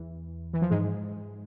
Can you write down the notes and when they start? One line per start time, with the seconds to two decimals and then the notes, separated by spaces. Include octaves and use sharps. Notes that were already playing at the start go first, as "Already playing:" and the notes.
Already playing: E2 E3
0.54 E3
0.62 F3
0.70 G#2 G#3